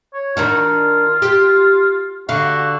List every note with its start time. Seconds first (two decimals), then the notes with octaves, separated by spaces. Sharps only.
0.13 C#5
0.37 D#3 D4 F4 F#4
1.22 G4
2.29 D3 F#4 F5